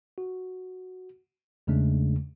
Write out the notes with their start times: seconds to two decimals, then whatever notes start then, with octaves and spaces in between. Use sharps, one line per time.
0.18 F#4
1.67 E2 C#3 G#3 A3 D4